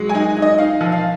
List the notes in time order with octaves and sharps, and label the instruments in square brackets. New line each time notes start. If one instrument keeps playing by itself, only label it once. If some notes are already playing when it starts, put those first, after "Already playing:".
Already playing: [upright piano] F#3 G#3
G#5
D#4
D#4
D#5
D#4 F5
F3
F5